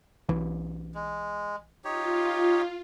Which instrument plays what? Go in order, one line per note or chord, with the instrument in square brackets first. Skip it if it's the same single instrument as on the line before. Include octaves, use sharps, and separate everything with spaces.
[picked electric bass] B1 E3
[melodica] G#3
[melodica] D#4 G4 C#5 [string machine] F4